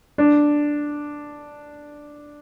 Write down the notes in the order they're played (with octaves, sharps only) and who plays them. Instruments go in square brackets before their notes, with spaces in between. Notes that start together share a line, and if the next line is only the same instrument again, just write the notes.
[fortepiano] D4